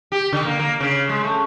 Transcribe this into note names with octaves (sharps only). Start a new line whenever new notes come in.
G4
D3
A#3
A#3
C#3
G#3
A3